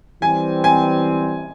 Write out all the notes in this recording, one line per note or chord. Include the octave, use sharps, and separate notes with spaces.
E3 G3 C4 G#5
G#5